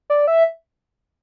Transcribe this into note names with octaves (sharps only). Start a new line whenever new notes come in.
D5
E5